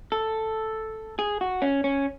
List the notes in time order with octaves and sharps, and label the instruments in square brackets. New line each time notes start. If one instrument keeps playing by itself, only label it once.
[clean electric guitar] A4
G#4
F#4
C#4
C#4